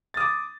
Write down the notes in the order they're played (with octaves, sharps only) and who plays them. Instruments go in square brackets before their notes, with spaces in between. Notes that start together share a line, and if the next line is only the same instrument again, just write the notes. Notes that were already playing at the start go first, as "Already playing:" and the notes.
[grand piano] A6
D#6
D6